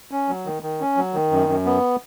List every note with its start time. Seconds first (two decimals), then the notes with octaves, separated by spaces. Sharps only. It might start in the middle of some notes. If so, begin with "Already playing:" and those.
0.11 C#4
0.29 F#3
0.46 D#3
0.63 D#3
0.80 C#4
0.97 F#3
1.14 D#3
1.32 F#2
1.48 F#2
1.66 B3